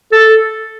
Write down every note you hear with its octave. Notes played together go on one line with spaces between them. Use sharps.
A4